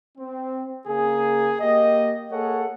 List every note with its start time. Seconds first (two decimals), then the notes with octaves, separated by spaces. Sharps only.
0.18 C4
0.87 C#3 A#3 G#4
1.61 A#3 G4 D#5
2.32 A#3 G#4 A4 C#5 F#5